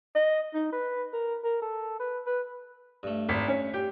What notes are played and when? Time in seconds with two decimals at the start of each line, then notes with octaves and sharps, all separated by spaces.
0.15 D#5
0.54 D#4
0.72 B4
1.13 A#4
1.44 A#4
1.62 A4
2.00 B4
2.27 B4
3.03 G2 A3
3.29 G#1 B6
3.48 C#4
3.74 G4